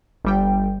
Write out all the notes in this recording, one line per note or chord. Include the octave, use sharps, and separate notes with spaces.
G1 G3 G5